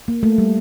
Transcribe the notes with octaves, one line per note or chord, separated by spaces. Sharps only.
A#3
A3
G3